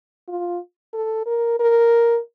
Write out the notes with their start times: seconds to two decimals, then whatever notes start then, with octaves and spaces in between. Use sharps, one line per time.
0.28 F4
0.94 A4
1.26 A#4
1.59 A#4